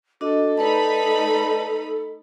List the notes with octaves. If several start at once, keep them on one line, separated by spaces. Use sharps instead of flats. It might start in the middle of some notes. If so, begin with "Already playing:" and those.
D4 F#4 A4 D#5
A3 D#4 B4 D5 A5 B5